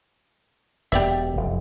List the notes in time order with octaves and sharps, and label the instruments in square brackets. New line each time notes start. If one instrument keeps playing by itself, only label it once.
[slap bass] E1 B3 [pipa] G4 D5 E5
[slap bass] F1 F#2